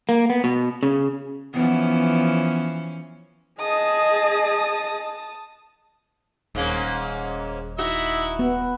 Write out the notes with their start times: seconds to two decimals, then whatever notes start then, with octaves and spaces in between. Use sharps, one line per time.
0.09 A#3
0.30 B3
0.44 B2
0.83 C#3
1.54 E3 F3 B3 C#4
3.60 G#4 D#5 A5 D#6
6.55 D#1 G#2 A#3 C#4
7.79 D#4 E4 F#4 E5
8.39 B3